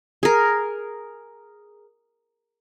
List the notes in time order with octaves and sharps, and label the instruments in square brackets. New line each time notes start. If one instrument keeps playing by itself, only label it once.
[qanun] G#4 A#4